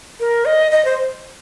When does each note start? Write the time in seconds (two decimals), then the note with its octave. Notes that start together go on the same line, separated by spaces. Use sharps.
0.20 A#4
0.45 D#5
0.71 D#5
0.85 C5